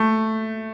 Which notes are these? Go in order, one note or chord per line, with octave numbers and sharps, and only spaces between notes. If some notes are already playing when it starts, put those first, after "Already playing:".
Already playing: A3